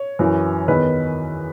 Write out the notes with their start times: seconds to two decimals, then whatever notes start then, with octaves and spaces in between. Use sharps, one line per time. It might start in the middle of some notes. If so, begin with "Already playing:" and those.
Already playing: C#5
0.19 F#2 E3
0.68 E2 D#3 B4